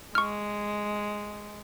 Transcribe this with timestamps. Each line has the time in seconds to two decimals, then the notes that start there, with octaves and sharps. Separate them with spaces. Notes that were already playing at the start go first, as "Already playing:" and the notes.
0.15 G#3 C#6 F6